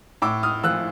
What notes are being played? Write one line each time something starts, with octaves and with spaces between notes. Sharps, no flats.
A2 D6 E6
D#6 F6
F3 E6 F#6